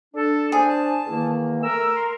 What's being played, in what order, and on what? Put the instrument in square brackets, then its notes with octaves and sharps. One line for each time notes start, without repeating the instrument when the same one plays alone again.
[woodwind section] D4 [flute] A4
[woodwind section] D4 C5 [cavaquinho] G#4
[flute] A5
[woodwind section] E2 D#3 A#3
[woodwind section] A3 E6 [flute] A#4
[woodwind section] C6